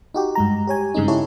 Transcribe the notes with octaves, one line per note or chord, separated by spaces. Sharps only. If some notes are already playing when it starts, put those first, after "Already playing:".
D#4 F#4 G4
G2 G#3 A#5
G4 C#5 G#5
G2 C#3 G#3 C4 D#4
E4 G4 A4 C#5